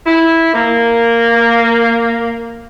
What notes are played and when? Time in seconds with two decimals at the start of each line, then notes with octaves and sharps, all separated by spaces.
0.06 E4
0.53 A#3